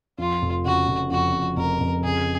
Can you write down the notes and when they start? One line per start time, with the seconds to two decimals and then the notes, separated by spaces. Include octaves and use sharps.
0.18 F2 F4
0.42 F1
0.65 C#3 F#4
0.87 F1
1.11 F2 F#4
1.33 F2
1.56 F1 A#4
1.80 F1
2.04 C#3 G#4